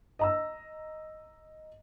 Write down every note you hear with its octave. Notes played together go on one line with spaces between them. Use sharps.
D#5 A#5 E6